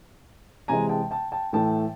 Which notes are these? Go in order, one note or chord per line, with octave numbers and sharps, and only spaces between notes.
C3 E3 G#3 G#5 A#5
G5 A5
G5 A5
G5 A5
A2 E3 A3 G5 A5